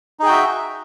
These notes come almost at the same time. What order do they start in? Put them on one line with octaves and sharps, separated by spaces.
D#4 G#4 G5 F#4 E5